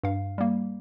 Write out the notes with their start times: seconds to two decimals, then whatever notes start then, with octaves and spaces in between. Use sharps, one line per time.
0.03 G2 F5
0.38 G3 A#3